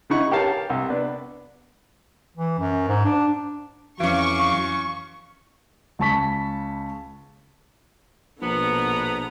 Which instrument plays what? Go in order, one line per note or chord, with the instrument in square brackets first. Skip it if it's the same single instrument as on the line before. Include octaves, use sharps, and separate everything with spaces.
[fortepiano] C#3 D#4 E4 F#5 C#6
G4 G#4 A#4 C#5 F5 A5
C2
B3 D4
[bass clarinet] E3
F#2
G#2
D4
[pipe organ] F2 F#3 D6 [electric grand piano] E3 C#4 [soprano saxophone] F5 [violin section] C#6
[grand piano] C#2 C#3 A5 C#6 B6
[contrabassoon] A#1 [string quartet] B2 D3 A#5 [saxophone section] B3